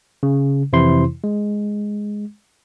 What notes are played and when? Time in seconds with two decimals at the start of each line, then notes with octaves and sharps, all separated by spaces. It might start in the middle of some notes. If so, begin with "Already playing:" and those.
0.23 C#3
0.73 F2 C3 E3 E4 C5 C6
1.24 G#3